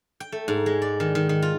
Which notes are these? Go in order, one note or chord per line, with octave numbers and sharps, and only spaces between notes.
G5
A3
G#2
G#3
D5
D#3
D#3
D#3
F4